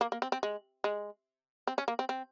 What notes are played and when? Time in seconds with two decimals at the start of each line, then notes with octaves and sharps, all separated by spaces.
0.01 A#3
0.12 A#3
0.22 C4
0.32 C4
0.43 G#3
0.84 G#3
1.67 C4
1.78 C#4
1.88 A#3
1.99 C4
2.09 C4